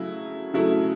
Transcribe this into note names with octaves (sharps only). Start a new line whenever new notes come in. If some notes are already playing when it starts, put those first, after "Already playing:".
Already playing: C#3 F#3 A3 E4
C#3 F#3 A3 E4